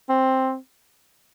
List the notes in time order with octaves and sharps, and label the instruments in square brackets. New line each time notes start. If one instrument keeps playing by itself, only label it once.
[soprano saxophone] C4